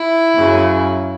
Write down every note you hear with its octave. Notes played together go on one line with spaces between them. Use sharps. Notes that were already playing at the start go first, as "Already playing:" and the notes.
Already playing: E4
F#2 C#3 F#3